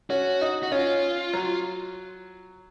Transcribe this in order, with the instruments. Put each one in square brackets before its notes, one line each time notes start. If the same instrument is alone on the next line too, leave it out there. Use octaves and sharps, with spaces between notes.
[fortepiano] C#4 [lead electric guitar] F#4
[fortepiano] D#4
[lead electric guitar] F#4
[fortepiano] C#4 [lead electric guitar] F4
[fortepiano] F#3